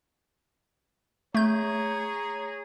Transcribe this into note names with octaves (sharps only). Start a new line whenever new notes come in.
A3 G#4 C#5 A#5 G6